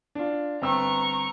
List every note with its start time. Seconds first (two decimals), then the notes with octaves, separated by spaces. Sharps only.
0.15 D4 F4
0.62 G1 C4 A#5 C#6 E6